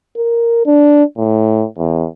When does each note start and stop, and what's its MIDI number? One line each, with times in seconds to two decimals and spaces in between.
0.17 0.65 70
0.66 1.04 62
1.17 1.66 45
1.78 2.07 40